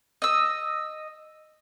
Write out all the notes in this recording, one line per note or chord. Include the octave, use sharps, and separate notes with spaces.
D#5 E6